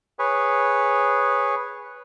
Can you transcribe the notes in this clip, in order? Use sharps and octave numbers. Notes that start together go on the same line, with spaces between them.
G#4 B4 C#5